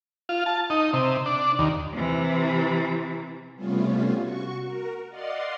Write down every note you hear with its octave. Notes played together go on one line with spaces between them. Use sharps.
F4
A5
D#4
C3
D4
D#2
C3 E3
C3 G3 A3 B3 C#4 F4
F#4 C#6
F#4 A#4
D5 D#5 F5 F#5 C6